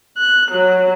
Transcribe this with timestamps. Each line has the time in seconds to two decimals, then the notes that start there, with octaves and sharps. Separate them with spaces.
0.18 F#6
0.51 F#3